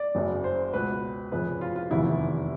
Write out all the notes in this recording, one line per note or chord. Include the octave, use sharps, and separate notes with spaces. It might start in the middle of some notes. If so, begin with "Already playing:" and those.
Already playing: D5
F#1 F#2 C#3
C5
C#2 B2 B4
F1 F2 C#3 B4
F4
F4
F1 E2 C3 D#3 E4